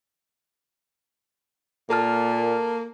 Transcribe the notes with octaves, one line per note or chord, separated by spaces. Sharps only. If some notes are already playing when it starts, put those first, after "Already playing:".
A#2 A#3 A4 A5 F6